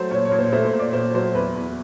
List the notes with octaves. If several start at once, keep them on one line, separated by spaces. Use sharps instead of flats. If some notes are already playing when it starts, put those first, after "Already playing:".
Already playing: F#3 A3 C5
A#2 C#5
C#5
A#2
C5
A3 C5
C5
A#2
D5
A#2 C5
F#3 C5
E2 B4
E2